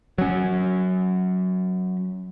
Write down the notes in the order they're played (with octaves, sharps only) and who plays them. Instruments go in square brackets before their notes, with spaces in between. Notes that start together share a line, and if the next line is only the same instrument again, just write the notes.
[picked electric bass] F#3 C#4